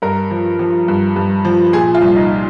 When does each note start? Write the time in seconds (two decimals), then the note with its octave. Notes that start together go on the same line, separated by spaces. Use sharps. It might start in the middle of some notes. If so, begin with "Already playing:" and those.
0.02 G2 A#4
0.31 F3
0.59 F3
0.88 G2
1.16 G2
1.45 F3
1.73 A#2 G#4
1.94 F4
2.02 C2
2.16 D#4